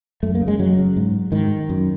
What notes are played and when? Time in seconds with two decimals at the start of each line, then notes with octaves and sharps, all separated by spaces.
0.23 F#2 A3
0.35 A#3
0.41 C#3
0.48 G#3
0.59 F#2 F#3
0.78 C#3
0.96 G#2
1.32 G#2 D#3
1.69 F#2